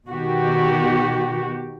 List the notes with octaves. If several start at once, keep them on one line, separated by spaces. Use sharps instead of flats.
B2 D#3 F#4 G4